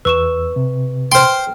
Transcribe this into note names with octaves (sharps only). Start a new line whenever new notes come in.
E2 B4 C#6 E6 E7
C3
C5 G5 C6 F6